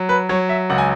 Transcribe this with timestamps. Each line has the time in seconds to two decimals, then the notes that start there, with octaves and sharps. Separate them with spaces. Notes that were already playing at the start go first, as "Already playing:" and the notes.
Already playing: F#3
0.09 B4
0.29 F#3 C#5
0.49 E5
0.70 C#2 F#5
0.78 G#5